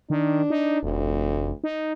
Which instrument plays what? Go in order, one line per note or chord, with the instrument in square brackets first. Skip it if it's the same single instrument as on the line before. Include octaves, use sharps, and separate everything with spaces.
[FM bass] D#3 [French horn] D4
[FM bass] D#4
[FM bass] F1 [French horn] D2
[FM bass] D#4